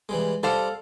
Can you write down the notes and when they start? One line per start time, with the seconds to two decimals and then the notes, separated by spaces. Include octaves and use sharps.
0.09 E3 G3 G#3
0.43 G3 A4 C5 D5 F5